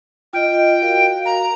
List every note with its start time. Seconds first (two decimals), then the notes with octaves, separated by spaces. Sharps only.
0.33 F4 D#5 G5
0.82 F#4 A#4 F5
1.26 A#5